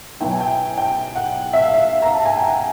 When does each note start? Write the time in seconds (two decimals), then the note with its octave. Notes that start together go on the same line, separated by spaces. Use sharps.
0.20 B2 F#3 B3 E4 G5
0.31 G#5
0.40 G5
0.78 G5
1.15 F#5
1.53 E5
1.64 F5
1.74 E5
2.02 A#5
2.14 A5
2.25 G#5
2.37 G5
2.49 F#5